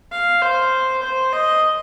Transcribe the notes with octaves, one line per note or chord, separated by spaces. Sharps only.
F5
C5
C5
D#5